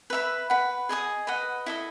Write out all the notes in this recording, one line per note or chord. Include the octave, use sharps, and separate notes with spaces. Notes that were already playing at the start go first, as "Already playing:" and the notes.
B4 E5 B5
B4 F#5 B5
G#4 D#5 G#5 D#6
B4 D#5 F#5
E4 A4 D#5